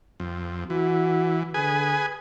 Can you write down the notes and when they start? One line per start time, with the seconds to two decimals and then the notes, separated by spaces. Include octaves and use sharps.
0.20 F2
0.70 E3 F#4
1.54 D3 G#4 B4 G#5